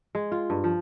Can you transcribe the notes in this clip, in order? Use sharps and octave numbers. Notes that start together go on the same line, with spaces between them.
G#3
F4
G2
F3